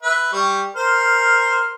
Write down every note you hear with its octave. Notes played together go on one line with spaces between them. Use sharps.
B4 E5
G3 C#6
A#4 C5 F6